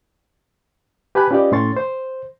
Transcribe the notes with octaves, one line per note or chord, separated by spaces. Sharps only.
G4 B4 G#5 A5 B5 F#6
C#4 F4 G4 B4 D5 D#5
A2 C#4 C6 C#6 A6
C5